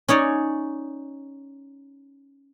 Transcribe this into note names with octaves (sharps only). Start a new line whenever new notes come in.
C#4 D#4 C#5 D5